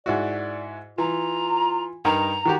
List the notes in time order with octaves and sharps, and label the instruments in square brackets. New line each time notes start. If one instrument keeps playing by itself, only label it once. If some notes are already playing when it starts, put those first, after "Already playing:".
[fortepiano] G#2 E4 F#4 [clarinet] D5
[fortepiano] E3 [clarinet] F4 [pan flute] A#5
[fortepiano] G2 D#4 A#4 [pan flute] A#5
[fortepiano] D#3 F#4 G4